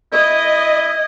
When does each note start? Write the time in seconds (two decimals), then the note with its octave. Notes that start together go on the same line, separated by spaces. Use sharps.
0.13 E4 D#5